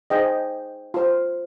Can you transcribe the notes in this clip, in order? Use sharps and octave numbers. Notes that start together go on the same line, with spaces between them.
D#4 G#4 C5 D#5 G5
F4 C5